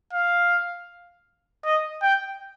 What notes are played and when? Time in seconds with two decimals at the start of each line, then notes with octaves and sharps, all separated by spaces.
0.13 F5
1.65 D#5
2.02 G5